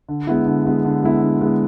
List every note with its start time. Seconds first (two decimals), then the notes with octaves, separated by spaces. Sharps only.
0.09 D3
0.27 G#3 B3 E4
0.46 D3
0.65 G#3 B3 E4
0.85 D3
1.03 G#3 B3 E4
1.22 D3
1.41 G#3 B3 E4